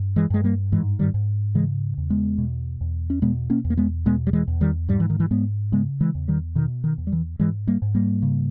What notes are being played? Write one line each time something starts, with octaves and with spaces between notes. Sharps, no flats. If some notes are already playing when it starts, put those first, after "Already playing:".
Already playing: G2
E3 G#3
G2 G#3
G3 A#3
G#2 E3 G#3
D#3 G3
G#2
C#3 E3 G#3
E2
G#3 B3
B2
E2
C#4
B2 G#3 B3
A#3 C#4
E2
A#3
G#3 B3
B2 G#3 B3
G3
E3 G#3
E2
D#3 G3
G#2 G3
E3
D#3
E3
G#2 G#3 B3
C#3 G#3 B3
E3 G#3
E2
D#3 G3
B2 D#3
D#3
E2
G3
E3
G#2 E3 G#3
G3 A#3
G#2
G3 A#3
C#3